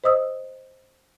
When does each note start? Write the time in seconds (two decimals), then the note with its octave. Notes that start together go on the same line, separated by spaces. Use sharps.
0.04 C5 D#5 D#6 E6